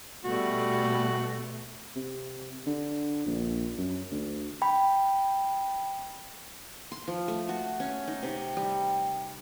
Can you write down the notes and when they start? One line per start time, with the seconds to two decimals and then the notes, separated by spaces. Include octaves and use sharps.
0.24 B2 G3 A3 F#4
1.96 C3
2.67 D3
3.26 A#1
3.78 F#2
4.11 D2
4.62 G5 B5
6.92 C6
7.08 F3
7.28 A3
7.49 F#4
7.80 C#4
8.07 D#4
8.23 C3
8.57 G3